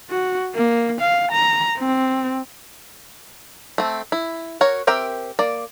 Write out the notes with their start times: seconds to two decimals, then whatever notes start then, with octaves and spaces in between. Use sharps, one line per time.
0.10 F#4
0.55 A#3
1.01 F5
1.32 A#5
1.78 C4
3.78 A3 C4
4.12 E4
4.61 F#4 A#4 C#5
4.87 C4 G4 A#4 E5 G5
5.39 A#3 D5